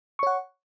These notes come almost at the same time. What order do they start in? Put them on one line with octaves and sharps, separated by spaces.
C#6 C#5 F#5